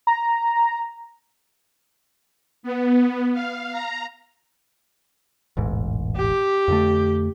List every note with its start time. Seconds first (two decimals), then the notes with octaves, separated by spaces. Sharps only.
0.07 A#5
2.63 B3
3.33 F5
3.71 A#5
5.57 E1 A1 G#2
6.16 G4
6.68 F2 D3 A3